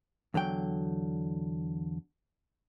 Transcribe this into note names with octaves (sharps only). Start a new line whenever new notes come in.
E2 D3 F#3 G5